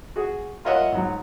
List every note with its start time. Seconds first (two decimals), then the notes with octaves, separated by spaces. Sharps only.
0.16 F#4 G#4
0.65 F4 A#4 C#5 D#5 E5 F#5
0.92 G#1 F#3